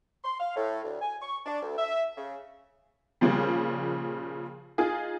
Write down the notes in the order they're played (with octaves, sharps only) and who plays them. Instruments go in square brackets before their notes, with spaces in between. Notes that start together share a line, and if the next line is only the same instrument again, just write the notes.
[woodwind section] C6
F5
A2
D2
G#5
C#6
D4
D2
E5
C#3
[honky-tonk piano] A#2 C#3 F3 G3
D#4 F4 G#4